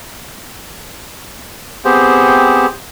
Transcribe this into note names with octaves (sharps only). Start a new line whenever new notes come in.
B3 C4 G4 G#4 C5